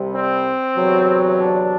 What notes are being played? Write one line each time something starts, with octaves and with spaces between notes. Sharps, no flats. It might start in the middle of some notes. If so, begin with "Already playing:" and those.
Already playing: C2 C3 G3
C4
E2 C3 F#3
D4